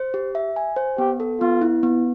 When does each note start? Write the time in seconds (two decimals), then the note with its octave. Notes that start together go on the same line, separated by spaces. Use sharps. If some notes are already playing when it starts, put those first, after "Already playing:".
Already playing: C5
0.14 G4
0.35 E5
0.56 G#5
0.76 C5
0.98 B3 G4
1.20 A4
1.40 B3 F4
1.62 E4
1.83 B3